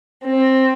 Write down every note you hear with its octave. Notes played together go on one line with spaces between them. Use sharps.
C4